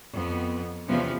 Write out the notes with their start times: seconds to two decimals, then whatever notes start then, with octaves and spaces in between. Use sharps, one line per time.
0.13 F2 B3
0.87 E2 C3 F3 B3 C#4